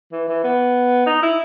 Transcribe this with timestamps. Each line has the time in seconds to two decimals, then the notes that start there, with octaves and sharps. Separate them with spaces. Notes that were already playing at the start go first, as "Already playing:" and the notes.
0.12 E3
0.28 E3
0.44 B3
1.06 D#4
1.22 E4